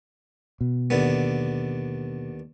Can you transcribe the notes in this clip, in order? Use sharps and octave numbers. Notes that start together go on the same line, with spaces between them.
B2
D#2 D3 B3